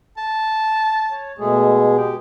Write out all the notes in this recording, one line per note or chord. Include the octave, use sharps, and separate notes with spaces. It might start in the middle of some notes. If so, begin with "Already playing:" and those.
A5
C#5
B2 G#3 A3 G#4
G4